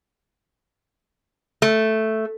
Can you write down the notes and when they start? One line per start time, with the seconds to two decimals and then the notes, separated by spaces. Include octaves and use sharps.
1.62 A3